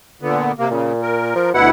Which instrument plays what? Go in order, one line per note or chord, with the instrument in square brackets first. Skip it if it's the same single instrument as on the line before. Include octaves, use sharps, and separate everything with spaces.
[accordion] A#2 D3 B3
C3 A#3
[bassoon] A#2 [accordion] C#3
[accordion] A#4
[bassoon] F3
[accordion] D2 E4 F#5 [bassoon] B2